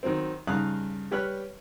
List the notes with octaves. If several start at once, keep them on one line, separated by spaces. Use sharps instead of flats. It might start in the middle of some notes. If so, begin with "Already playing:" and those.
D#3 F#3 C4
G2 C#3 D#4 F5 D#6 F#6
G3 G4 B4 C#5 F6 F#6